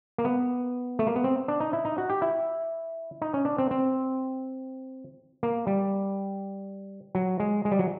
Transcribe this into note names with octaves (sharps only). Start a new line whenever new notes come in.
A#3
B3
A3
A#3
B3
C4
D4
D#4
E4
D#4
F#4
G4
E4
D#4
C#4
D4
C4
C4
A#3
G3
F#3
G#3
G#3
G3
F#3